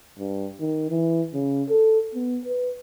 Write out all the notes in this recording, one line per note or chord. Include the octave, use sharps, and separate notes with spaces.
G2
D#3
E3
C#3
A4
B3
B4